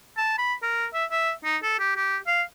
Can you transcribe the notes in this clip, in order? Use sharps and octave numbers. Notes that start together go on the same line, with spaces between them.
A5
B5
A#4
E5
E5
D#4
A4
G4
G4
F5